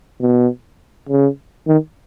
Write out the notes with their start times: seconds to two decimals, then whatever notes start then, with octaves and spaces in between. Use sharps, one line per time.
0.21 B2
1.09 C#3
1.68 D#3